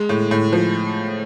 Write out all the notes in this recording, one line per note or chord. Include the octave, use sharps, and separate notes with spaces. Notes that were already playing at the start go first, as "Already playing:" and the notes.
Already playing: G#3
A2
A2
F3